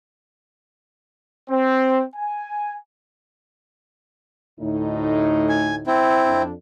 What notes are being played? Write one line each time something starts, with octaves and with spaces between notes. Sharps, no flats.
C4
G#5
D2 A2 D#4
G#5
C4 E4
F2 D4